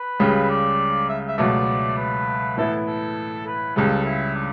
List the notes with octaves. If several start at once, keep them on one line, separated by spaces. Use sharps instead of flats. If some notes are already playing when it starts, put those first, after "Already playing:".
Already playing: B4
C#2 C#3 G3
D5
E5
E5
C#2 B2 F#3 A3 D5
B4
A2 E3 B3 E4 A4
A4
B4
C#2 C#3 G3 A4
E4
D4